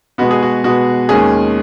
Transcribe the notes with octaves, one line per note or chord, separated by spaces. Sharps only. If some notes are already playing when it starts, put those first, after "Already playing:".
B2 G#3 B3 F#4
G#4
F#4
B2 G#3 B3 F#4
D#2 D#3 G#3 C#4 G#4